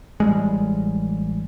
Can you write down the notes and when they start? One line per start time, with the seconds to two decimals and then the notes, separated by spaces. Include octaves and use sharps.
0.20 A1 G3 G#3